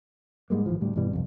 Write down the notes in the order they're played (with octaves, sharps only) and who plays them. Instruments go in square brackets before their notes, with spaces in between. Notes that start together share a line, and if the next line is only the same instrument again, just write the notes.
[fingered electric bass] G#2 G3 G#3 A#3
G#1 D2 E3 F3
D2 A2 G3
G2 B2 E3 G3
C2 F2 C3